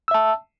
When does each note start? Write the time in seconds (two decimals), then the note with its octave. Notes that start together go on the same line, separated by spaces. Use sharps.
0.08 E6
0.11 E5
0.14 A5